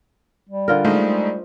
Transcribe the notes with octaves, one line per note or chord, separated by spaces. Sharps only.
G3
D3 F4 A#4
G#3 A3 D#4 C5 D#5